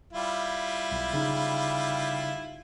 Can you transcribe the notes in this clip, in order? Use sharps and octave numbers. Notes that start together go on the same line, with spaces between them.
G3 E4 F4
B1
C#3 D#4